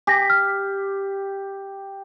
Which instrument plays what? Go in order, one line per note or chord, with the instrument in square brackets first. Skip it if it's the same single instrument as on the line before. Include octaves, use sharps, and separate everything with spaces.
[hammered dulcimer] G4 [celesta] G#5 A#6
[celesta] F6